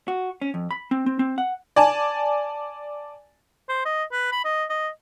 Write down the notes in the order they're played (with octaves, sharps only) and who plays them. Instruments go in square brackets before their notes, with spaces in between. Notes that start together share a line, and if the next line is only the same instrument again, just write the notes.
[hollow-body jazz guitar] F#4
C#4
F2
B5
C4
C4
C4
F#5
[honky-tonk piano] D5 G#5 A5
[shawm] C5
D#5
B4
B5
D#5
D#5